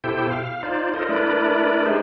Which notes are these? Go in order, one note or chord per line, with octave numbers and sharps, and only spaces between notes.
B2 E4 G4 A4 C5 G5
F5
D#4 F4 C5 D5
F4 A4 A#4 C5 D#5
A3 D4 E4 A#4 B4 D5
G#3 D#4 G4 G#4 B4 C5